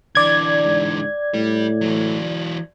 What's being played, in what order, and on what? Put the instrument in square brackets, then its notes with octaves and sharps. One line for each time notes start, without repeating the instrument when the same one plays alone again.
[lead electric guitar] D3 E3 [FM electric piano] D5 G#6
[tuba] G#2
[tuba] A2 [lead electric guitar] G3
[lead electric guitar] E3 F#3